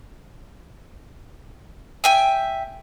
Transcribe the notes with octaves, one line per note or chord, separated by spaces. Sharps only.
E5 G5 G#5